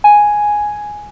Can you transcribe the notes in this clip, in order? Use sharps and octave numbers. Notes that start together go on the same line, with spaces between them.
G#5